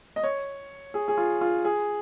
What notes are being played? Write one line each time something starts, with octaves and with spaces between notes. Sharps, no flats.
D#5
C#5
G#4
G#4
F4
F4
G#4